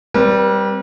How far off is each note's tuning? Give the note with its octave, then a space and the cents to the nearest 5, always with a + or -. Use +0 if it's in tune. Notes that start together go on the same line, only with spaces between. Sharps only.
G3 +0 C4 +0 B4 -45